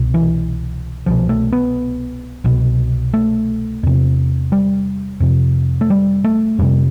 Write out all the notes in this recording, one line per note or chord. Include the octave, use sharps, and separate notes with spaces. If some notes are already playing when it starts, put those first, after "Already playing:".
Already playing: C2 B2
E3
C2 B2 F3
A3
B3
C2 B2
A3
E2 C3
G3
F2 C3
A3
G3
A3
F2 C3 G3